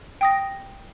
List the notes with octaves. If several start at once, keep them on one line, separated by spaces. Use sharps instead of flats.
G5 D#6 A#6